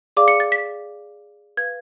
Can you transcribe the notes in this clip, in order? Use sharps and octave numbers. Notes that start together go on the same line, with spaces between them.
G#4 D5 F5 D6
C#7
A6
B6
B4 F5 G#6